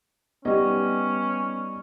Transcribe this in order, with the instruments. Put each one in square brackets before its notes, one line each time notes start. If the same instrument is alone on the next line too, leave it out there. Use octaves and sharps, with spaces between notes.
[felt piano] G3 D#4 D#5 [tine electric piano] B3 [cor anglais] C#4